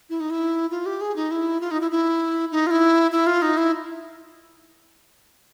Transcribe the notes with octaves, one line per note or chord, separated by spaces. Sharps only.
E4
D#4
E4
F4
G4
G#4
D#4
E4
F4
D#4
E4
E4
D#4
F4
E4
E4
F4
D#4
E4